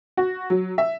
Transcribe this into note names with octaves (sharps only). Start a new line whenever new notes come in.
F#4
F#3
E5